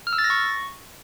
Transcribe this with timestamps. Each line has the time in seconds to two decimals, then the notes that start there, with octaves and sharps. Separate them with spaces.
0.07 F6
0.13 E6
0.18 A6
0.24 A#6
0.30 C#6